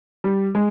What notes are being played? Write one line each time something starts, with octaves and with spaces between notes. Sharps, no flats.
G3
G#3